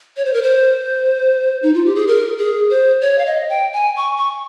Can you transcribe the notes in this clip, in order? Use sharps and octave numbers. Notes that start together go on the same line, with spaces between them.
C#5
C5
A#4
C5
D#4
F4
G4
G#4
A#4
G#4
C5
C#5
F5
D#5
G5
G#5
C#6
C#6